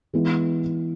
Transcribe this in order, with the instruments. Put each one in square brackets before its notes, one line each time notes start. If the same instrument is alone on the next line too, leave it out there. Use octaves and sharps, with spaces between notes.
[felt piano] E3 G#3 B3 E4